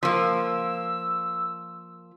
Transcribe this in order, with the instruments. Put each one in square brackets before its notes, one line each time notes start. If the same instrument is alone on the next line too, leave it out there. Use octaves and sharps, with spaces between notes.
[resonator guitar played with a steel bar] F3 A#3 [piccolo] E6